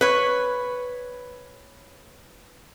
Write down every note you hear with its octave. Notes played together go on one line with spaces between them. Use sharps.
B4 C#5